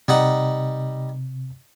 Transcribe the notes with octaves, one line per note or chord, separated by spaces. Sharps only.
C3 G3 D#4 F#5